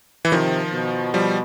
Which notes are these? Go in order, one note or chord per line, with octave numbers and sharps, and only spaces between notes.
E3
C3 D#3 F3
B2
F3 G3